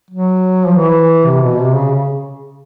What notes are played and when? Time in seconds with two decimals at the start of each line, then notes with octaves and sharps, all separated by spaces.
0.11 F#3
0.67 F3
0.76 E3
1.25 C3
1.43 B2
1.58 C3
1.76 C#3
1.92 C#3